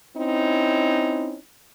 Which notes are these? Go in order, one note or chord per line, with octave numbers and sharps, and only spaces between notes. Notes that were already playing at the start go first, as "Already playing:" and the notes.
C4 C#4 D#4 E4